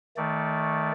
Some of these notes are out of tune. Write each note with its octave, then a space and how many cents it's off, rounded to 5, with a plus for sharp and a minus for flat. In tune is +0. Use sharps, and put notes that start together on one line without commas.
D#3 +20 A3 +0 D5 -15